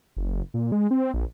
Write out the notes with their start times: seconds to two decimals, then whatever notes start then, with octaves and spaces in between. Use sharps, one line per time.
0.16 F#1
0.54 A#2
0.72 G#3
0.91 C4
1.14 A#1